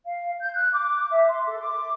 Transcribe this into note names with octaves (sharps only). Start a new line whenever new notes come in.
F5
G6
F#6
D6
E5
C6
A4
D6